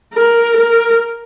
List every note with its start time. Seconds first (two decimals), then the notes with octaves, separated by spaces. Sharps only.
0.14 A#4
0.57 A#4